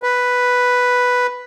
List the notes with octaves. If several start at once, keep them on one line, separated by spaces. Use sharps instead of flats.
B4